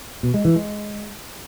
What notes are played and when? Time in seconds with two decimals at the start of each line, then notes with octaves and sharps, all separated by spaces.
0.23 B2
0.34 G#3
0.45 E3
0.56 G#3